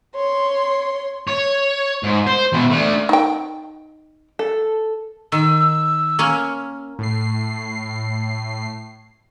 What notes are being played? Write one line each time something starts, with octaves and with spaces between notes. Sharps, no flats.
C#5 C6
C#5
G#2
C5
B2 E3
A3 D4
D#4 G5
A4
D#3 E6
A#3 C#4
A2 C7